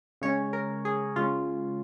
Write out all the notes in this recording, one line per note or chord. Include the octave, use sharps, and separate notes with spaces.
C#3 G#3 C#4 C#5
A#4
G#4
C#3 G#3 C#4 F4